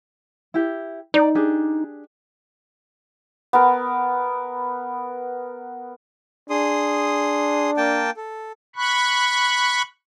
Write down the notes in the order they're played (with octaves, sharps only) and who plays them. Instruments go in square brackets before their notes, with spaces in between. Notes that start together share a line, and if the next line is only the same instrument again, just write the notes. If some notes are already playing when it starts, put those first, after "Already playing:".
[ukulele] E4 G4
[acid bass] D#4 [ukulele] D5
[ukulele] D4 G4 G#4
[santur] B3 A#4
[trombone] D4 [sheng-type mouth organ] G#4 C6 D#6
[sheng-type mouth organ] A#3 G5 A5
A4
[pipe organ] B5 C#6 F#6